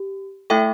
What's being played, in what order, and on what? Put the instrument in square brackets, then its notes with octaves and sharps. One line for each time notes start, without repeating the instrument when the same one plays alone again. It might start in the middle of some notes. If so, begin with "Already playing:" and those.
Already playing: [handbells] G4
A3 E4 A4 E5 G5